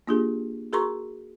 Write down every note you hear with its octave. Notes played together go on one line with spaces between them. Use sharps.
A#3 D4 F4 G4 G#4
F#4 G#4 A#4 A#5 C6 C#6